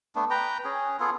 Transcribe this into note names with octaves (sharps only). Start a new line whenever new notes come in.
A3 B3 D4
B4 G5 A#5
C#4 G#4
B3 F4 G#4 A4